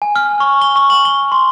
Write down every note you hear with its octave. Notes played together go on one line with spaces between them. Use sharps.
G#5
F6
C#6
G7
C#6
F#7
G7
C6